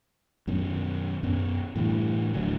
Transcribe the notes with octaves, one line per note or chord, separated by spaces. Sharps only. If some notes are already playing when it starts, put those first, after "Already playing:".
F#2 B2 D#3
F#2 B3
A2 D3 E3 G3
D1 A2 D3 F#3